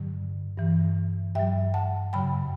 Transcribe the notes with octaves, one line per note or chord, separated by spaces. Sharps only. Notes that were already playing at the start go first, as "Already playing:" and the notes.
Already playing: G2 D3 F#3
G2 E3
G2 F#3 E5 G5
F#5 A5
F#2 C#3 F#3 G5 B5